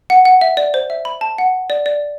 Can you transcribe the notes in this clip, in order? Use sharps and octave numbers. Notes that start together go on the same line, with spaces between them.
F#5
F#5
E5
D5
C5
E5
B5
A5
F#5
D5
D5